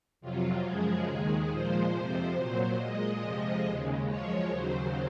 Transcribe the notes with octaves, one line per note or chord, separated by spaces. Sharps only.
F2 C3 F#3 F4
F#2 C#3 F3 G#3 G#4
D#2 D#3 G#3
A#2 F3 G#3 C5
F2 C3 F3 C5
A#2 F#3
A#2 G#3 D#5
F2 C3 F3 G#3
D#2 C#3 G#3
F#2 F3 G#3 C#5
D#2 C#3 F#3 C5